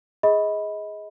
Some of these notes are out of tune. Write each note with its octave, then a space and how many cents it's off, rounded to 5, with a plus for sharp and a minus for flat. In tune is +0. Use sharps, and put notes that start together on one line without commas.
G#4 +0 D#5 +25 B5 +0